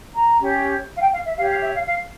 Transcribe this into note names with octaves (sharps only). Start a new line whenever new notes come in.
A#5
C#4 G4 C#5
F5
G5
F5
E5
G4 C#5 F5
F5
E5
F5
F5